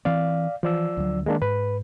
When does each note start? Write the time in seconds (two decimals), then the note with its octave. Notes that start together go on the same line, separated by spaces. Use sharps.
0.05 E3 C4 D5 F5
0.63 E3 F3 D5 E6
0.97 D2 F#3
1.26 D#3 G#3 A#3 D4
1.42 G#2 B4